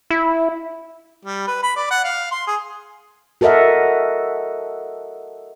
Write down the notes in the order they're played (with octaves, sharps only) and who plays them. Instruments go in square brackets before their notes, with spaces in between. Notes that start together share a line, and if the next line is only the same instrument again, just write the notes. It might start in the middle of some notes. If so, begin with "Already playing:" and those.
[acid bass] E4
[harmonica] G3
B4
B5
D5
F#5
F5
C6
G#4
[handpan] F#4 A4 A#4 D#5 E5 F#5